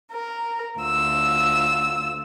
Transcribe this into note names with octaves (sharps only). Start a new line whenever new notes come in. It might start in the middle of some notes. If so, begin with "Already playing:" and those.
A#4
D2 F4 E6